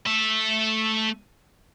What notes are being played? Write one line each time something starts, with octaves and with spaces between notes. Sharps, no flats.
A3 E5